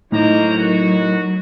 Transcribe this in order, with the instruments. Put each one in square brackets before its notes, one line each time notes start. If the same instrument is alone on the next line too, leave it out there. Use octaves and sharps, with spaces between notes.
[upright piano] A2 [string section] F#3 [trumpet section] A#3 C5 A#5 [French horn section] D#4
[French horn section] D#4 A#4 [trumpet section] F#4